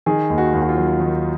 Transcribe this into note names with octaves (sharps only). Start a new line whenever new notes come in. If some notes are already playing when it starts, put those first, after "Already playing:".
D#3 G#4
D#2
F#4
D#2
F#4
F4
F#3
D#3 D#4